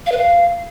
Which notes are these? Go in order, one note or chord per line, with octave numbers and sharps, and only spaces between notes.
F5
B4
F5